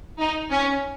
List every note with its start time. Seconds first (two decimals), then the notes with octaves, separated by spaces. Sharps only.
0.20 D#4
0.52 C#4